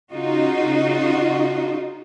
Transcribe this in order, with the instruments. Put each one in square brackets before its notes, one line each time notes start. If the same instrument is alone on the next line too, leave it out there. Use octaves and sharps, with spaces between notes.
[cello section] C#3 D#4 F4 F#4